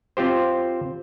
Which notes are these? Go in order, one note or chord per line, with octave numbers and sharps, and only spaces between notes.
C4 F4 G4 C5